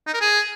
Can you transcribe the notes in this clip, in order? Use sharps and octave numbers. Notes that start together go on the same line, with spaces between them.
D#4
A#4
G#4